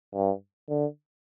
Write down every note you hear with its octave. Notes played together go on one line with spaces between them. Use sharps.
G2
D3